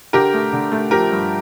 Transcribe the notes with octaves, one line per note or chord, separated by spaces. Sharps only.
D3 G4 A#4
A3
D3
A3
F3 G4 A#4
G2